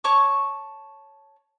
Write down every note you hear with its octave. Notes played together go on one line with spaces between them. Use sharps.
C#5 A5 C#6 D6